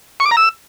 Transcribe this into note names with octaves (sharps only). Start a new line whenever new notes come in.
C#6
D6
A#5
E6